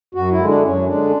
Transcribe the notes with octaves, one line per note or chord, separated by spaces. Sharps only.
F#2 F#4
E4
D3 G#3
D4
F#2 C#4
D3 G#3 D4